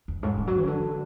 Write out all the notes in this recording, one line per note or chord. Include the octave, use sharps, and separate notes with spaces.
E2
G#2
C#3
F#3
E3
C#3
D3